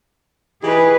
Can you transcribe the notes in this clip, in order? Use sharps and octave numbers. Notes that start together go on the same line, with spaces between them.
E3 D#4 G4 G#4 B4